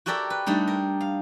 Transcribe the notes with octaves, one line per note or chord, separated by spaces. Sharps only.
F#4 G4 A4 A#4 D5 E5
B4
G3 A3 D4 D#4
A#4
F5